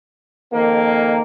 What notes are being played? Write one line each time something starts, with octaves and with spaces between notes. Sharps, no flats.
F2 D#3 A#3